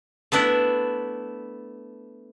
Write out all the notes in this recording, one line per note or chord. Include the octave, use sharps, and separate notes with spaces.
A3 B3 D4 E4